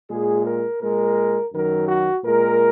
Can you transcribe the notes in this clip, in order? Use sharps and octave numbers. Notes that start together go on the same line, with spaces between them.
A#2 G#3 G#4
A#4
A#2 G#3 A#4
F#2 D#3 F#3 A#4
F#4
A#2 G#3 A#4